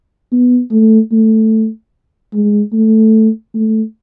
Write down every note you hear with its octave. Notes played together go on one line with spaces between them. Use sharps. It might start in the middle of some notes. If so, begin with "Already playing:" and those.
B3
A3
A3
G#3
A3
A3